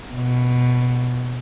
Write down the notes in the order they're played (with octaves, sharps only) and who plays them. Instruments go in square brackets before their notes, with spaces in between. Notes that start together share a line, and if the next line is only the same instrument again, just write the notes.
[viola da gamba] B2